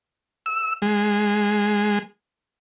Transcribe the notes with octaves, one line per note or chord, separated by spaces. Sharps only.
E6
G#3